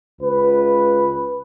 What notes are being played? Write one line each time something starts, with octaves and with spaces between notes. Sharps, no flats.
C#2 B4